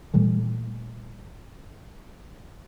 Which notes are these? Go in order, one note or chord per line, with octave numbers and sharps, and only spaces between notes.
A#2 E3 G3 A3